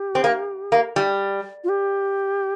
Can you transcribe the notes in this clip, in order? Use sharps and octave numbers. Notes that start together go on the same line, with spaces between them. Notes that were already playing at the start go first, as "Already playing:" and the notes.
Already playing: G4
C4
A#3
A#3
G3
F4
G4